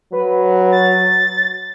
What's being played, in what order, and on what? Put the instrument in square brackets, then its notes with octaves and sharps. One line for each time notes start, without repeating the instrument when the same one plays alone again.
[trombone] F#3 [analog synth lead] B4
[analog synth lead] A6